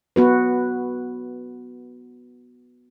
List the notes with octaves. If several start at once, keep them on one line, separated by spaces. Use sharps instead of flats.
B3 F#4 B4